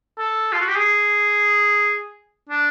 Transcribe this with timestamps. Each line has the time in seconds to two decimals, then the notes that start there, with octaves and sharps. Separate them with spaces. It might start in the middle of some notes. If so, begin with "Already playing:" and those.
0.18 A4
0.53 F4
0.61 F#4
0.68 G4
0.76 G#4
2.49 D4